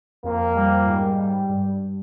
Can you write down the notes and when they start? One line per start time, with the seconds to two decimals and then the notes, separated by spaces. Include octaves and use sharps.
0.24 F2 A#3
0.56 G3
0.87 G#2
1.18 G3
1.49 G2